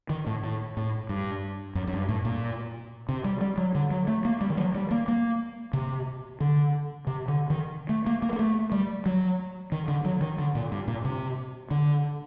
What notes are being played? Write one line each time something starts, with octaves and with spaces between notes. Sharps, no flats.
D#3
A2
A2
A2
G2
F#2
F#2
G2
A2
A#2
C3
G3
G3
F#3
D3
F#3
A3
A#3
G3
D#3
F#3
G3
A#3
A#3
C3
D3
C3
D3
D#3
A3
A#3
A#3
A#3
A3
G3
F#3
D#3
D3
F#3
D#3
D3
A#2
G2
A#2
C3
D3